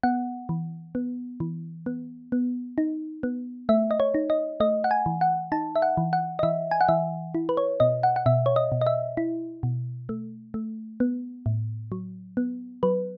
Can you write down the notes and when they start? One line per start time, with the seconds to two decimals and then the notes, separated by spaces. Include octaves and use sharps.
0.03 B3 F#5
0.49 E3
0.95 B3
1.40 E3
1.86 B3
2.32 B3
2.78 D#4
3.23 B3
3.69 A3 E5
3.91 D#5
4.00 C#5
4.14 D#4
4.30 D#5
4.60 A3 D#5
4.84 F#5
4.91 G#5
5.06 E3
5.21 F#5
5.52 D#4 A5
5.76 E5
5.82 F#5
5.97 E3
6.13 F#5
6.39 D#5
6.43 E3 E5
6.71 G#5
6.81 F#5
6.89 E3 E5
7.35 E4
7.49 B4
7.57 C#5
7.80 B2 D#5
8.03 F#5
8.16 F#5
8.26 B2 E5
8.46 C#5
8.56 D#5
8.72 B2
8.81 D#5
8.87 E5
9.17 E4
9.63 B2
10.09 A3
10.54 A3
11.00 B3
11.46 A2
11.92 F#3
12.37 B3
12.83 F#3 B4